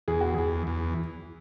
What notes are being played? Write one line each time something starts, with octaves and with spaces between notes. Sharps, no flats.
E2 G#4
F#4
E2 G#4
E2